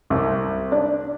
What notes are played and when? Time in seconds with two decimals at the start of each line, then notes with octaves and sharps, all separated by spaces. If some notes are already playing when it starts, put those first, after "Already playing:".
0.10 C2
0.72 D4